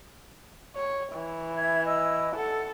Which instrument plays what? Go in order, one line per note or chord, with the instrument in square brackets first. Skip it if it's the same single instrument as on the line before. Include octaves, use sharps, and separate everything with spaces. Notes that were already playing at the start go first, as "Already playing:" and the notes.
[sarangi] C#5
E3
[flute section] E5 G#6
D#5 E6
[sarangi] A4 [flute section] F#5